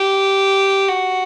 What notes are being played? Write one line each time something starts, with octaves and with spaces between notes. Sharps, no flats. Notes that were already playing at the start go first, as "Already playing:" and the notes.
Already playing: G4
F#4